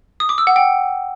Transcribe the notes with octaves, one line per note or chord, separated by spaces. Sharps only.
D#6
D6
E6
F#5
G5